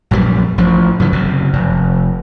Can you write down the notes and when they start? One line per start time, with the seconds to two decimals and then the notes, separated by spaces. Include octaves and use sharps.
0.11 A#1 F#2 C#3 G3
0.58 A1 F3
1.00 F#2 C#3 E3
1.12 F#1 F#2 C3
1.53 F1